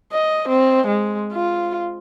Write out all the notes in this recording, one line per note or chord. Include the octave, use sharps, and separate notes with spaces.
D#5
C4
G#3
F4